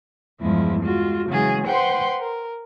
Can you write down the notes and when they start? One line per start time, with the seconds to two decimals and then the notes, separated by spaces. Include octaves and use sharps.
0.40 E2 G2 F3 G#3 E4
0.81 G#3 F4 F#4
1.28 C#3 E3 F#3 G#3 G#4
1.66 B4 C5 F#5 G5 C6 C#6
2.20 A#4